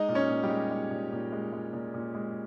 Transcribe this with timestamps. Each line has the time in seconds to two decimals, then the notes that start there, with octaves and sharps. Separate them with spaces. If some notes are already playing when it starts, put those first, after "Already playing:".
Already playing: G#3 D#4 D#5
0.08 A#2
0.15 C#4 C#5
0.30 A#2
0.43 G3 G4
0.50 G#3
0.70 G#3
0.91 A#2
1.12 A#2
1.32 G#3
1.53 G#3
1.73 A#2
1.94 A#2
2.15 G#3